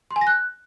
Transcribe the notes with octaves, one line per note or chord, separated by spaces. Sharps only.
C6
G#5
A#6
F#6